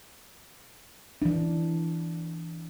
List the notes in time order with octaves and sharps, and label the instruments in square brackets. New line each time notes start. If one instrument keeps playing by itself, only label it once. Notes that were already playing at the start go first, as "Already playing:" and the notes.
[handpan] E3 D4